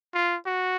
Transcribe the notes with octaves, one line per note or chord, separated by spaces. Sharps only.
F4
F#4